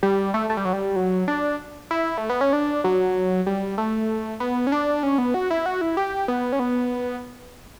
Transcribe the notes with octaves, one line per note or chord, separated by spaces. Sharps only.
G3
A3
A3
G3
F#3
G3
F#3
D4
E4
A3
B3
C#4
D4
F#3
G3
A3
B3
C#4
D4
C#4
B3
F#4
E4
F#4
E4
G4
B3
C#4
B3